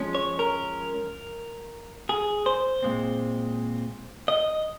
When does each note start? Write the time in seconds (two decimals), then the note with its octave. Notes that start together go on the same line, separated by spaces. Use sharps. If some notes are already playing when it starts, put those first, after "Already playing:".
Already playing: F3 G#3 C#4
0.15 C#5
0.39 A#4
2.09 G#4
2.46 C5
2.83 A#2 G#3 C4
4.28 D#5